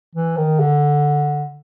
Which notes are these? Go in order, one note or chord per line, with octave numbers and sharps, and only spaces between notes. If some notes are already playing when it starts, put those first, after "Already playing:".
E3
D#3
D3